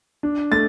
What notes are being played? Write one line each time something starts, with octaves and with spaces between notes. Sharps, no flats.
D4
A3 A6